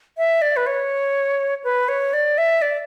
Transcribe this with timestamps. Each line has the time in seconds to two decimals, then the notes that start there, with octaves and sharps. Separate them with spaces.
0.18 E5
0.42 D5
0.57 B4
0.67 C#5
1.64 B4
1.88 C#5
2.13 D5
2.38 E5
2.62 D5